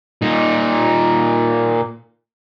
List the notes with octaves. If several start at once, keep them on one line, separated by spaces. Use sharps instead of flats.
A#2 D#4